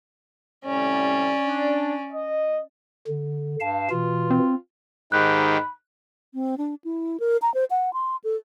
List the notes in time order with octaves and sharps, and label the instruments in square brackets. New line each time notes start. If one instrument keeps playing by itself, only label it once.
[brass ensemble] A2 C3 G3 [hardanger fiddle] C#4 D5
[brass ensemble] D4
D#5
[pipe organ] D3
[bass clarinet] G2 [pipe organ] F5 A5
[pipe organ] B2 E3 [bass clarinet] F4
[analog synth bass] C4
[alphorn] G#2 [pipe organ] D#3 G4 [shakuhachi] B5 [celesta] F#6
[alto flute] C4
D4
E4
A#4
A#5
C5
F#5
C6
A4